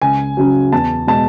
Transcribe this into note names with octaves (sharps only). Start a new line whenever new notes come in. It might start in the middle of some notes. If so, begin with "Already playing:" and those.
C#2 G#5
C#3 F#3
E2 A5
B2 G#3 A5